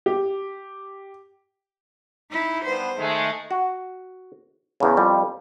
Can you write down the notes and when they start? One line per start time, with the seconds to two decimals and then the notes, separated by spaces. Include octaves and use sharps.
0.06 G4
2.31 D#4 E4
2.65 G2 B3 C5
2.97 D#3 G#3 A3
3.51 F#4
4.80 E2 C#3
4.97 F2 G3